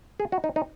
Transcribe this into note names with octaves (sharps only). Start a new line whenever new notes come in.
G#4
F#4
D#4
D#4